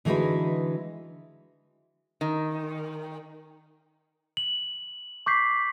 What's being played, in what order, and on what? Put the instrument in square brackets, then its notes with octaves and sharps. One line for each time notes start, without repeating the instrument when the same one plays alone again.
[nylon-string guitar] D3 E3 G#3 D#4 F#4 B4
[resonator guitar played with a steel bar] D#3
[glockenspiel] F#7
C#6 D6 G6 B6 C7